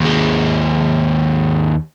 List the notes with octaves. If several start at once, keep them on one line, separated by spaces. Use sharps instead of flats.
D#2 G#3